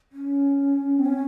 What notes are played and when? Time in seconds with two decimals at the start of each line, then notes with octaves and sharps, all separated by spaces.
0.12 C#4
0.99 C4
1.06 C#4